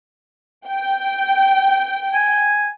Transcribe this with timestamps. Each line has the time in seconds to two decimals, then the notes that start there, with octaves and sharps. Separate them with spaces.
0.67 G5
2.13 G#5